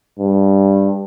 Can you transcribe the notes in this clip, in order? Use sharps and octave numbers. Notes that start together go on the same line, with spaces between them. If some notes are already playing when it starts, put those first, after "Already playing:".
G2